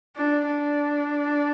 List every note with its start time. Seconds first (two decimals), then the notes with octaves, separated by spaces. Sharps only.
0.16 D4
0.46 D4